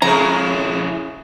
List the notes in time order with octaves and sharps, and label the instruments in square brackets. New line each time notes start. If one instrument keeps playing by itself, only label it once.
[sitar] F2 C#3 G#3 [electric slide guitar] C#4 E4 C#5 [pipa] A#5